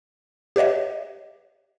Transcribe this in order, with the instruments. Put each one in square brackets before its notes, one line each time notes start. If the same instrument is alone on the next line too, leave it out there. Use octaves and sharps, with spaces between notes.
[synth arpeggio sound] G4 B4 C#5 D#5 E5